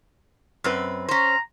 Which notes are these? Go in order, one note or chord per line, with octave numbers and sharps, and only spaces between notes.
F#2 C4 B4
C#4 C5 A#5